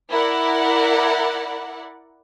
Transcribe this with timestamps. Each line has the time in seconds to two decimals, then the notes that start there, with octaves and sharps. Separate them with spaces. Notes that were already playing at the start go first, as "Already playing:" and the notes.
0.10 E4 A#4 D5 F#5